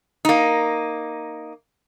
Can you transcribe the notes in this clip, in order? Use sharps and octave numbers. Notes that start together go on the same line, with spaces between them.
A#3 D#4